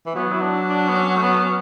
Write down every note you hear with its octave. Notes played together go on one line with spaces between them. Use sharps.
E3
F#3 B3
E4
D4
D4
B3
C#4
A3
B3
C#4